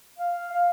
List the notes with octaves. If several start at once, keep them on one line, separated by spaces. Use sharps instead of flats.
F5
F5